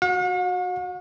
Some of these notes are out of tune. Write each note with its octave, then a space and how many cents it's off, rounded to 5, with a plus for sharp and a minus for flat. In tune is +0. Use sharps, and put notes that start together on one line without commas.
F#4 -10 F#5 -45